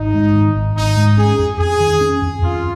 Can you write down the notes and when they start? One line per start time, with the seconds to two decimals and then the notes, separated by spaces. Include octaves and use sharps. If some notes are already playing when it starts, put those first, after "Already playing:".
Already playing: G#1 D#4
0.14 G#2
0.34 D#3
0.55 G#1
0.76 G#1 D#4
0.97 G#2
1.17 C#4 G#4
1.39 F2
1.59 F2 G#4
1.80 D#3
2.01 C#4
2.22 F2
2.42 F2 F4